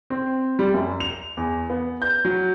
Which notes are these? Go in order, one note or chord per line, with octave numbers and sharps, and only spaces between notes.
C4
G3
F#2
F7
E2
B3
G6
F#3